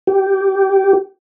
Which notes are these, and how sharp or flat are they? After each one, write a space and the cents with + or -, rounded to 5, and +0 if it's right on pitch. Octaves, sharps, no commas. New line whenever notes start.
G4 -15